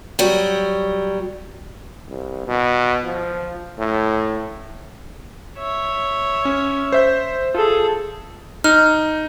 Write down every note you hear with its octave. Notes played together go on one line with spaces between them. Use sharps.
F#3 G3
C2
B2
F3
A2
C#5 E5
C#4
C5 E5 G6
F4 G#4 A4
D#4 F6